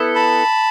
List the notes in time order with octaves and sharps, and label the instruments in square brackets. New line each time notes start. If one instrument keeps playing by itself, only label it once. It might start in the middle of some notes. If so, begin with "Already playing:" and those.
Already playing: [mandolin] B3 E4 A4
[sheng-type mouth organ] A5 B5